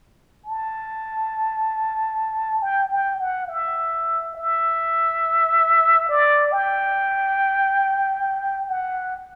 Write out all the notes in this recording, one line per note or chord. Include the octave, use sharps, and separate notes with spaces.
A5
G5
G5
F#5
E5
E5
D5
G5
F#5